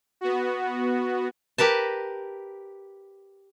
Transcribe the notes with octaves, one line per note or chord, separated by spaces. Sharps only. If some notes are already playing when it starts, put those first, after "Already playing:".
B3 F#4
G4 A#4 B4 A5